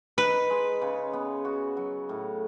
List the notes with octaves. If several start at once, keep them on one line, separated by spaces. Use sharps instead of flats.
D#4 B4
G#3
C#3
B3
F#4
F#3
A2